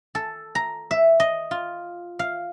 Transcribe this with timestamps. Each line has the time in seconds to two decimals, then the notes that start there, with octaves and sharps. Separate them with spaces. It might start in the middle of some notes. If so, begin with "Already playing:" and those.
0.15 A4
0.55 A#5
0.91 E5
1.20 D#5
1.51 F4
2.19 F5